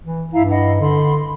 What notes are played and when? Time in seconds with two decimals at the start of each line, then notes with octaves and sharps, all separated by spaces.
0.05 E3
0.34 G2 E4 F5 A#5
0.49 D#5 F#5 B5
0.80 D3 B5 C6